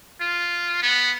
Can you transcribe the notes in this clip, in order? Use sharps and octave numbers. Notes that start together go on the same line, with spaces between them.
F4
B3